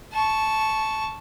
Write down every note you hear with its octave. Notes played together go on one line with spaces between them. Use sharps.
A5 C#6